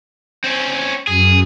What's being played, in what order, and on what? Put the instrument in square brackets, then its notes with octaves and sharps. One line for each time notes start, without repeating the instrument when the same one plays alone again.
[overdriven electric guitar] C4 C#4
[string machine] F#2 [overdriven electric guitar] G#4